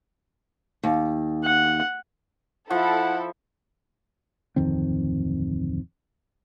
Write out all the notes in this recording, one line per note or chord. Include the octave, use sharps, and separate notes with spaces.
D#2
F#5
F3 E4 A4 F#5
D1 F2 D#3 C4